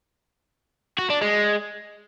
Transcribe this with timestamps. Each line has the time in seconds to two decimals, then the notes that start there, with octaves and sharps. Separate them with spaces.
0.99 F#4
1.10 D4
1.22 G#3